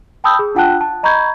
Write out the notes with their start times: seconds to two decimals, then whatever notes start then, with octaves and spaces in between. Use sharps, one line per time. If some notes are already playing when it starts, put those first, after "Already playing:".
0.24 G5 A5 B5 D#6 E6 G6
0.39 G#4
0.55 D4 F4 F#5 G5 A5 F#6
0.81 A5
1.03 D#5 A#5 B5 C#6 G6 G#6